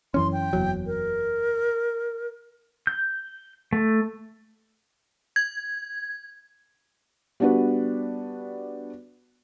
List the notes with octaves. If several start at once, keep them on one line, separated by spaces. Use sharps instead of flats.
F#2 E3 C#4 C6
G5
F#1 E2 F#3
A#4
G6
A3
G#6
G3 B3 D4 F#4 B4